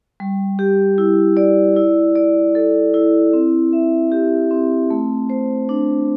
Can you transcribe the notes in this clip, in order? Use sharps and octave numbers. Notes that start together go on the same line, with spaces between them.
G3
G4
E4
D5
E4
D5
A4
E4
C4
E5
G4
C4
A3
C5
D4